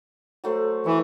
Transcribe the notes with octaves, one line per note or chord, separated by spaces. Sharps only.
F#3 A3 C5
E3 C#6